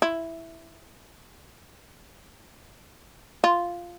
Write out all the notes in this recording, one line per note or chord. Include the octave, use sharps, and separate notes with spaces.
E4
F4